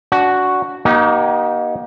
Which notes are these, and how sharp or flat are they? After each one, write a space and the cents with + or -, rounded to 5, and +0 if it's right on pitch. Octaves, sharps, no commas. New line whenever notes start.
D4 -25 F#4 +0
A#3 +35 D#4 +0 G4 -35